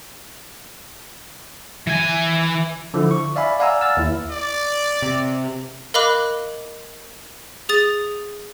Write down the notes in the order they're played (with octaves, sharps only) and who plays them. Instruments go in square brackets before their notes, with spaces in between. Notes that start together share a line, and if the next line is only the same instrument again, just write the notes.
[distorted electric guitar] E3 G#5
[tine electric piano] D3 F3 E4
C#6
D5 E5 F5 G#5 B5
D5 F5 F#5 G#5 A#5 E6
E6 F6 A6
D#2 E4
[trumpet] D5
[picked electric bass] C3
[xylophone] A#4 D#5 F5 B5 D6 F#6
G#4 D#6 A6